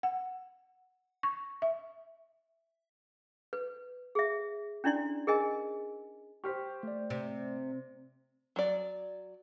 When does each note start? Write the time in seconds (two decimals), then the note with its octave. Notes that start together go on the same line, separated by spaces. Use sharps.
0.03 F#5
1.23 C#6
1.62 E5
3.53 B4
4.15 G#4 E5
4.84 C#4 D4 E4 D5 C6
5.27 G#4 A#4 D#5 G#5
6.44 G4 C5 C#6 F6 B6
6.83 A3 D5
7.10 C3
8.56 F#3 D5